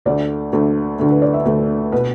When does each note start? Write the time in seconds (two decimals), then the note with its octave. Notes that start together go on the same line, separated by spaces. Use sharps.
0.05 D2 D3 A3 D5
0.53 D2 D3 A3
0.99 D2 D3 A3
1.10 B4
1.22 D5
1.34 E5
1.45 D2 D3 A3
1.92 B2 B3 B4